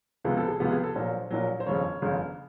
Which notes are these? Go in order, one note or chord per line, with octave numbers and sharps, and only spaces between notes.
C#2 C3 F3 G#3 B3
A4
G#4
C#2 C3 F3 G#3 B3 G4
G#4
A4
A#1 A#2 F#3 C5
A#1 A#2 F#3
C5
G1 F2 C#3 C#5
G1 F2 C#3